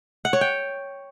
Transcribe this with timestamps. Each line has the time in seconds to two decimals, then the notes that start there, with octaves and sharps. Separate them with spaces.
0.25 F#5
0.33 C#5
0.41 G5